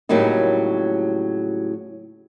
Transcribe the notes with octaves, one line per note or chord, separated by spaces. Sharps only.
A2 C#3 F#3 G3 A#3 D#4